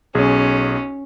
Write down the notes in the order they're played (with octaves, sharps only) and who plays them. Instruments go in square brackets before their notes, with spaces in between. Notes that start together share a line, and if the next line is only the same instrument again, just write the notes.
[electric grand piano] B1 G#4 [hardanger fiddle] C#4